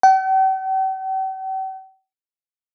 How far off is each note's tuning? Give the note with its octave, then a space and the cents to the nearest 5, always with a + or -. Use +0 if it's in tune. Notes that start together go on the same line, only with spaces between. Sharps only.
G5 -45